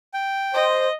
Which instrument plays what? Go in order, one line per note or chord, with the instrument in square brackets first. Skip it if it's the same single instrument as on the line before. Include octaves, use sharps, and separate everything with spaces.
[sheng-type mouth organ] G5
[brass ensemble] C5 [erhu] D#5